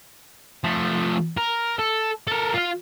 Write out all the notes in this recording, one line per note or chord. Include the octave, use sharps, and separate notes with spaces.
F3 A3
A#4
A4
A4 A#4
F4 F5